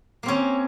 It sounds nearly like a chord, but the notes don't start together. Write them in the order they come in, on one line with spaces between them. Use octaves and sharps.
A#3 C4 C#4